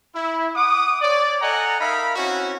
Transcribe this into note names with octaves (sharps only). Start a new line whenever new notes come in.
E4
F#5 D6 D#6
C#5 D5
A4 D#5 F#5 G#5 A#5
D#4 A#4 E5 F5 B5
C4 C#4 E4 F#4